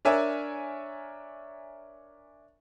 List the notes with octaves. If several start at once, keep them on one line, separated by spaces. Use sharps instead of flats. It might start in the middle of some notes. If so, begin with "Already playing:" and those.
D4 A#4 C#5 E5 G#5